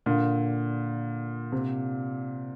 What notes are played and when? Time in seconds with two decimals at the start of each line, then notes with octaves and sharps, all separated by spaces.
0.06 A#2 D3
1.52 C3